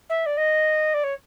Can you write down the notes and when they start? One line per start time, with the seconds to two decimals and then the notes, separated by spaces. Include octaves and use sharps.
0.09 E5
0.26 D5
0.37 D#5
0.93 D5
1.03 C#5